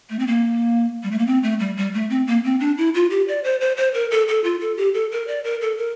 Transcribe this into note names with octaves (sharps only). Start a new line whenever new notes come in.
A3
C4
A#3
G3
A3
A#3
C4
A3
G3
G3
A3
C4
A#3
C4
D4
E4
F4
G4
D5
C5
C5
C5
A#4
A4
A4
F4
A4
G4
A4
A#4
D5
A#4
A4
A#4